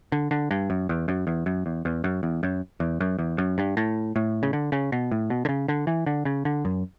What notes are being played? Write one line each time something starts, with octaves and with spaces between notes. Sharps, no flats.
D3
D3
G2
F#2
E2
F#2
E2
F#2
E2
E2
F#2
E2
F#2
E2
F#2
E2
F#2
G2
A2
A2
C#3
D3
C#3
B2
A2
B2
D3
C#3
D3
E3
D3
C#3
D3
F#2